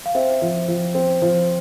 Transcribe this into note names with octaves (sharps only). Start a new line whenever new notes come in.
F5
C4 C5 E5
F3
F3
C4
F3